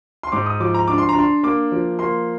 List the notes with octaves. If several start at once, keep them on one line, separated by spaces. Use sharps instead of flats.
C6
G#2 D6
D#6
F3 D6
A#5
D4 D6
C6
A#5
D4 C6
A#3 D6
F3
A#3 C6